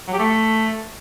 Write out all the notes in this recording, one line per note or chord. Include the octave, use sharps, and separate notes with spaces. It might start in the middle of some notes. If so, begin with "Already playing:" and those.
F#3
G4
A3